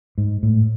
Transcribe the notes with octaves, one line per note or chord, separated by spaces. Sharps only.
G#2
A2